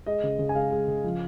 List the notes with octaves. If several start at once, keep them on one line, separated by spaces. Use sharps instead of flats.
G#3 D#5
C#3
C#3
G#5
G#3 F5
G#3
C#3
F3